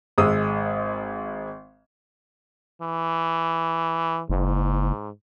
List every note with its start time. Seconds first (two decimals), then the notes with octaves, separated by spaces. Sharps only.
0.18 G#1 G#3 D#6 E6
2.82 E3
4.30 F#1 G#2